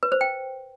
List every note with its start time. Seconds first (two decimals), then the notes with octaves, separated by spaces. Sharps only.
0.03 B4
0.12 C5
0.21 G5